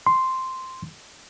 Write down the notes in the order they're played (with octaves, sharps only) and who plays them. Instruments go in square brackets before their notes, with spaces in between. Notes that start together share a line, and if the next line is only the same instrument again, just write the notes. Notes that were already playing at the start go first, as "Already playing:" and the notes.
[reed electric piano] C6